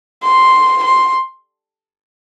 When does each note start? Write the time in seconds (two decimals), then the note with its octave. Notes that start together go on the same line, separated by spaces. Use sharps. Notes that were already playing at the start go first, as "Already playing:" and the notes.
0.23 C6
0.84 C6